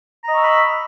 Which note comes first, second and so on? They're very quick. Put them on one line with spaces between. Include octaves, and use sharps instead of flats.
A#5 D#5 C#6 E6 B5